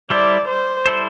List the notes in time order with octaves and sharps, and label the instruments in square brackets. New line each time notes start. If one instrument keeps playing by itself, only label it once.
[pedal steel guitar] G3 E4 A4 C5 [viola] D5
[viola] C5
[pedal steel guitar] G3 E4 A4 C5